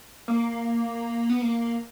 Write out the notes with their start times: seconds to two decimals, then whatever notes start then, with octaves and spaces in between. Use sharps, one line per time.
0.28 A#3
1.29 B3
1.42 A#3